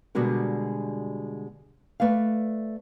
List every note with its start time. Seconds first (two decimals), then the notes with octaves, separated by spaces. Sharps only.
0.15 B2 D3 G3 G#3 F#4 A#4
2.00 A3 B4 D5 F5